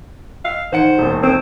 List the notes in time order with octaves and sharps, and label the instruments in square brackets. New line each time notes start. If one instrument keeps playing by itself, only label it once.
[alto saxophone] F5
[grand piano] D#3 F#5 C#7 [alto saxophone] C5
[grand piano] E1 D#2
[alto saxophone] C4